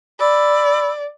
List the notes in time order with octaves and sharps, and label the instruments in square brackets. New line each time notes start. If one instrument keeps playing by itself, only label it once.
[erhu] D5 [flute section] B5 E6